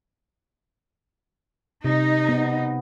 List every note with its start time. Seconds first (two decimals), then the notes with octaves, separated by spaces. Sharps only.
1.84 C3 D#4
2.29 B3